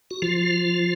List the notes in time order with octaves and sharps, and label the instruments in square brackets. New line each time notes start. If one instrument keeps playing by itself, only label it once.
[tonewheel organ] F#4
F3 F4